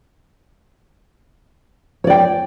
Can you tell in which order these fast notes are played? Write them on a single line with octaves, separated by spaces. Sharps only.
C#5 D5 G5